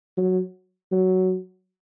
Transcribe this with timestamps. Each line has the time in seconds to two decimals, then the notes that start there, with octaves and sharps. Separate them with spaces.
0.17 F#3
0.92 F#3